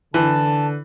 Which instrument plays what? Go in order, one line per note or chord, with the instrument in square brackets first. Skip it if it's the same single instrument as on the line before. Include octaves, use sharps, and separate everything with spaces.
[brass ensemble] D3 [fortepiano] E3 [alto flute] A5